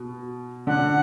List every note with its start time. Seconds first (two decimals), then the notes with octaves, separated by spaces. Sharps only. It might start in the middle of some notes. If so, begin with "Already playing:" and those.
Already playing: B2
0.67 D3 F#5